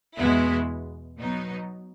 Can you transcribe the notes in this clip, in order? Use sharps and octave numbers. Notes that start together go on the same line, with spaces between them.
E2 B2 G#3 B3 E4
B2 F#3 B3 D#4